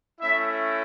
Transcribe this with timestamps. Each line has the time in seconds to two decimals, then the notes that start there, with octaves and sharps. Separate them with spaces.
0.21 A3 C#4 E4 E5